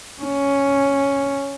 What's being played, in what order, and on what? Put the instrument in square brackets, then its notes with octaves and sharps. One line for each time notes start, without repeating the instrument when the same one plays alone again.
[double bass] C#4